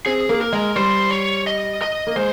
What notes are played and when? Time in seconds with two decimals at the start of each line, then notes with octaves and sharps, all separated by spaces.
0.06 C4 G#4
0.29 A#3
0.41 A#4
0.53 G#3
0.76 G3 C5
1.11 C#5
1.47 D#5
1.82 D#5
2.07 A#3
2.16 G#3 C5